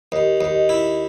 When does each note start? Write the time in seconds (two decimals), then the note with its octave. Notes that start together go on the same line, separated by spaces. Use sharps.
0.12 D#2 D#5
0.41 D#2
0.55 D#5
0.69 E4